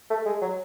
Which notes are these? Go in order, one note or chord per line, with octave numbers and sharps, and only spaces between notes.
A3
G#3
F#3